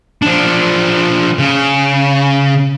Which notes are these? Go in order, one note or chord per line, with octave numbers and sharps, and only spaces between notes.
F3 D4
C#3